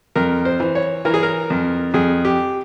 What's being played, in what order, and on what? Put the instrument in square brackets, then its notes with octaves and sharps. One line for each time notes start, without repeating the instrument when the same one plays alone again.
[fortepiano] F2 A#4
C5
E3
C#5
E3 A#4
G#4
A#4
F2
F2 G#4
G4